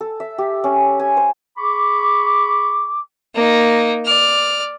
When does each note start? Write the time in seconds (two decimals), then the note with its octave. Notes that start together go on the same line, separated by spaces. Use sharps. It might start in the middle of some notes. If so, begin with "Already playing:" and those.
0.01 A4
0.20 E5
0.38 G4
0.64 C#4
1.00 G#5
1.17 C5
1.57 G#4 B5 C#6 D6
3.35 A#3 D#4
4.06 D5 F6